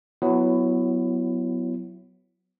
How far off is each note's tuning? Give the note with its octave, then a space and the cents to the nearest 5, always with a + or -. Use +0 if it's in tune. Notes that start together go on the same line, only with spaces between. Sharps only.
F#3 +0 B3 +15 E4 +20